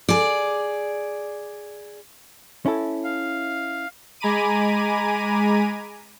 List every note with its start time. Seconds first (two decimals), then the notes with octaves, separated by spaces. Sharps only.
0.09 G#4 D5
2.66 C#4 E4 A4
3.04 F5
4.20 G#3 G#5 A#5 B5 D6 D#7